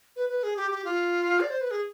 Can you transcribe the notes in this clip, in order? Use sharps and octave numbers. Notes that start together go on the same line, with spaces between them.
B4
B4
G#4
G4
G4
F4
D5
C5
B4
G#4